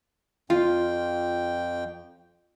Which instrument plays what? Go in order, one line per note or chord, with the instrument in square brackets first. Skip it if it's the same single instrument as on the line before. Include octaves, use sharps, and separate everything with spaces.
[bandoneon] F2 G5 [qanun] F4